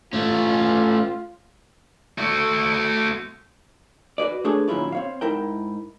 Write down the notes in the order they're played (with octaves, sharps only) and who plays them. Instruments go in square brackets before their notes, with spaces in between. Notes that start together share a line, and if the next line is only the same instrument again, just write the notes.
[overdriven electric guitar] A3 C#4 [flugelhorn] F4
[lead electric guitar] A3 F#4
[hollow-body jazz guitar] F#4 G#4 B4 D5
A3 D4 G#4 A4 B4 C#5
A#2 D#3 F#3 C#4 E4 F4
C4 C#5 F5
G#2 D#4 E4 A#4 G5